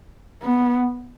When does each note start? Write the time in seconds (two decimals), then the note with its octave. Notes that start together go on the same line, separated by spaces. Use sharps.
0.43 B3